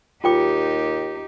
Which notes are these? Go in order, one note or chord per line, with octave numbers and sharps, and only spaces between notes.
D#2 D#4 F4 G4 G5 D6